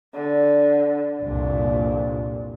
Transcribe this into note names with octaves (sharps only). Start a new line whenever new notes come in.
D3
C2 F2 A#2 D4